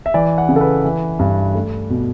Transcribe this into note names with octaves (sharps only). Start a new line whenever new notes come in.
E5
E3 D5
F#5
C#3
A4
B4
E3
G2
A3
B2